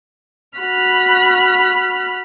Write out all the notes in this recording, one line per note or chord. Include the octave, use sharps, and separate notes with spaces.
F#4 B5 F6 F#6